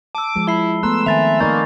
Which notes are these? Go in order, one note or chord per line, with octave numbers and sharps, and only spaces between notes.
A5 D6 E6
F3 G#3
E4 B5 C7 G7
A3 B3 A#5 C6 E6 F#6
D#3 C4 E5 G#5 A6 F7
A#3 D#4 D5 D#5 C#6 G6 A6